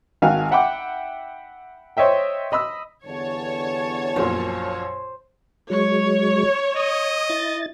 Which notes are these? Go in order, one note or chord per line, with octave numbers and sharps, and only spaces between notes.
G#1 F#4 F5 G#5
E5 F#5 G5 B5 D6
C5 C#5 D#5 E5 G5
D#5 B5 D#6 E6
E2 G2 D3 C#5 A5
A#1 F#2 A#2 C5
F#3 G#3 C#5
D#5 D#6
E4 A6